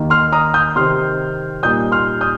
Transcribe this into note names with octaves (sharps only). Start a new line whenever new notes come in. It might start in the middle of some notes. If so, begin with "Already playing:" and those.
Already playing: D#2 D#3 A#3
C6 F6
A#5 D#6
D#6 G6
C3 D#3 C4 C6 F6
A#2 G3 D#4 D#6 G6
C6 F6
D#6 G6